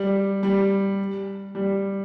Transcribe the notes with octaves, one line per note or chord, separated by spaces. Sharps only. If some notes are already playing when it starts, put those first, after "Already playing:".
Already playing: G3
G3
G3